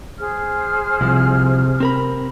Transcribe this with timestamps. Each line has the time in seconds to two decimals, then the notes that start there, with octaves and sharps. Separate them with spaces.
0.18 G#4 C5 F6
1.01 C2 C3 F3
1.80 C4 A#4 B5